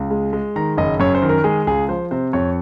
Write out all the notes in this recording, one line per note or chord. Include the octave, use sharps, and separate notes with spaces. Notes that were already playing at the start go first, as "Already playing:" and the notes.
Already playing: C#2
G#3
G#3
D#3 A#5
F#1 D#5
F#2 C#5
C5
D#3
A#4
G#3 G#4
C#2 G#4
F3 C5
C3 C5
F2 C#5